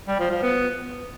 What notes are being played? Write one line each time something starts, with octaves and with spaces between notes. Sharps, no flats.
G3
F3
F3
B3